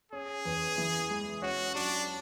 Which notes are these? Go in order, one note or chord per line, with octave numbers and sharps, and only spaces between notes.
C#4 G#4
E2
E3
G#3
C#4 F#4
F#3 D4